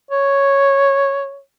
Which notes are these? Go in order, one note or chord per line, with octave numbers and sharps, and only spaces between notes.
C#5